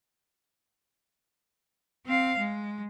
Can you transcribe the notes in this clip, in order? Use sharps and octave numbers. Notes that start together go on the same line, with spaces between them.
C4 F5
G#3